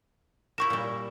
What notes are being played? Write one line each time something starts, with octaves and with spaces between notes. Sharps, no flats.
E4 G4 A#4 C#6 E7
A#2 G3